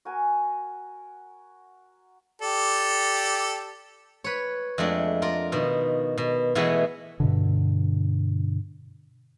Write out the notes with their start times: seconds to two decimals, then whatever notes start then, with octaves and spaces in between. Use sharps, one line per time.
0.05 F#4 A#4 G#5
2.42 G4 A4 D5
4.24 B4 C#5
4.78 F2 G#3 A3 D4
5.22 F4 A#4 D5
5.52 B2 D#3
6.18 B2
6.55 B2 E3 G#3 A3 B3 G#4
7.20 G2 B2 D3